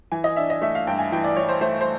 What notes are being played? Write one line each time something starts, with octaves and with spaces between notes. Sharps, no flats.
E3 G#5
D#5
D4 E5
D#5
A3 E5
F5
G2 G5
G#5
E3 G5
D5
E3 C#5
C5
A3 C5
C5